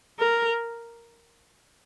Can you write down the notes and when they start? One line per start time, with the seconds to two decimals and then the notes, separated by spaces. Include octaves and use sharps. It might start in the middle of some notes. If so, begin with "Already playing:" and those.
0.19 A#4